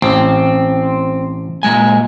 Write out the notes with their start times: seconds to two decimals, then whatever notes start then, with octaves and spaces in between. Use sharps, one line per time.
0.02 A1 C4
1.63 A#2 G#3 G#5